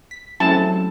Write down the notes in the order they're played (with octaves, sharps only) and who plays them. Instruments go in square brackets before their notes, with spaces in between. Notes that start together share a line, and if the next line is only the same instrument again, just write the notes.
[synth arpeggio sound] B6
[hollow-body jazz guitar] F#3 G#3 A3 [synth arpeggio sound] C4 C#4 E4 [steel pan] A5